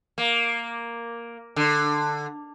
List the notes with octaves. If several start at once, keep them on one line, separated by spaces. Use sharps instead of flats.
A#3
D3